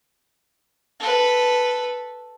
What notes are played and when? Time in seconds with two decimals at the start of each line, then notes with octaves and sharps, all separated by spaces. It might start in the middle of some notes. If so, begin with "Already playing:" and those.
1.00 A4 B4